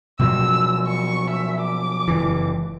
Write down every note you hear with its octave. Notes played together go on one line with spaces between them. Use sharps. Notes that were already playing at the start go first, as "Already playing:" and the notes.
B2 F3 F#3 E6
C#6
E5
D6
F#1 E3